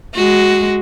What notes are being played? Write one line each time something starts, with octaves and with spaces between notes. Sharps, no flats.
G#3 F#4